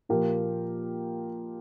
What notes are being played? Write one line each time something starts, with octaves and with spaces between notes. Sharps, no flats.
A#2 F3 A#3 G4 A#4